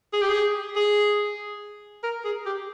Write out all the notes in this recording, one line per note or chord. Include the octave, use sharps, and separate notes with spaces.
G#4
G4
G#4
G#4
A#4
G#4
G4